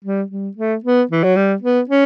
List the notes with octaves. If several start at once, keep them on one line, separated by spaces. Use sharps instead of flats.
G3
G3
A3
B3
E3
F#3
G3
B3
C#4